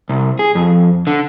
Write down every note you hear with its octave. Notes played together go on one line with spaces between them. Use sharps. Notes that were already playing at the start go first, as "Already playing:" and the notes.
C2
G#4
F2
D3